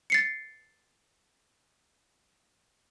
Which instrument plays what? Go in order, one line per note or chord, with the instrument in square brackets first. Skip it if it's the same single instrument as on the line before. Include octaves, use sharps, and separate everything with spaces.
[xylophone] A6 C7 C#7